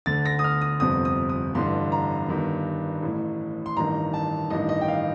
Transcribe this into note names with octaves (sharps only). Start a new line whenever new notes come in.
D2 D3 A6
A#6
D#6
F6
D#6
G1 F2 C3 D#6
D#6
D#6
A1 G2 D3 C6
A#5
G1 G2 D#3
A1 A2
C6
A1 G2 D#3 A#5
A5
A1 G2 D#3 D#5
D#5
G5
F5